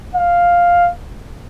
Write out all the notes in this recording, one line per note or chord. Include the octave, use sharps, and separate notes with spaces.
F5